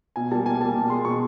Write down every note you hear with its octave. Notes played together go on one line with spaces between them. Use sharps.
B2 G#5
G3 A#3 A5
B2 G#5
G3 A#3 A5
B2
G#3 C6
B2 C#6